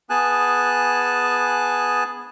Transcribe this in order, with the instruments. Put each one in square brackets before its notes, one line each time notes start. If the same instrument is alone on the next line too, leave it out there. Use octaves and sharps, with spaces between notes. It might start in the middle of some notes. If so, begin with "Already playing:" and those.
[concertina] B3 G#4 G#5 A5 F#6